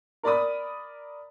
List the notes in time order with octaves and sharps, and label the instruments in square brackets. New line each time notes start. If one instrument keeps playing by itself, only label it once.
[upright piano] A#4 D5 B5 D#6